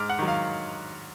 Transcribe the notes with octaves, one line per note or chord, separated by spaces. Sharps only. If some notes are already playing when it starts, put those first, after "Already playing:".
Already playing: G#2 D6 F6
F#5
D#3 F#3
F5